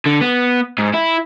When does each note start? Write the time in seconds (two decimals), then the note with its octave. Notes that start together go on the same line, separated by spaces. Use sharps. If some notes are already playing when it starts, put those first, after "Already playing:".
0.06 D3
0.21 B3
0.79 G#2
0.94 E4